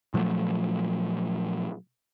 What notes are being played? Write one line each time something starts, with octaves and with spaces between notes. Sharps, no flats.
A#2 F3 F#3 A3